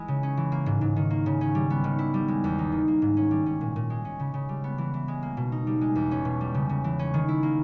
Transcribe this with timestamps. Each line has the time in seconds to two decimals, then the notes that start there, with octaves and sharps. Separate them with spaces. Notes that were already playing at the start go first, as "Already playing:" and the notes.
Already playing: E3 G#3 E4
0.08 C#3
0.23 C#4
0.37 E3
0.52 A#3
0.66 G#2
0.81 G#2
0.96 D#3
1.10 A#3
1.26 C#3
1.41 C#4
1.55 G3
1.70 B3
1.84 D#3
1.99 E4
2.14 G3
2.28 G#3
2.44 E2
2.59 D#4
2.72 D#3
2.88 A#3
3.02 G#2
3.17 C#4
3.31 G3
3.46 C#4
3.61 A#2
3.76 A#2
3.90 G#3
4.05 C#4
4.19 C#3
4.34 C#3
4.49 G3
4.64 B3
4.78 E3
4.94 E3
5.08 G#3
5.23 A#3
5.37 B2
5.52 D#4
5.67 G3
5.81 G#3
5.96 E2
6.11 C#4
6.25 B2
6.41 G3
6.54 C#3
6.69 C#3
6.84 E3
6.99 C#4
7.14 D#3
7.28 E4
7.43 A#3